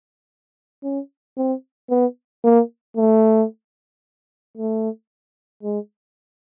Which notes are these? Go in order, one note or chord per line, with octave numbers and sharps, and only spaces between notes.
C#4
C4
B3
A#3
A3
A3
G#3